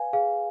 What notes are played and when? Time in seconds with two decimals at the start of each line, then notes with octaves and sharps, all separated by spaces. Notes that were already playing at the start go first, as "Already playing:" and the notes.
Already playing: B4 D5 F5 G#5
0.13 G#4 F5